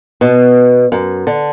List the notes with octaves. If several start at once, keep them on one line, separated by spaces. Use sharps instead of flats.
B2
F#2
D3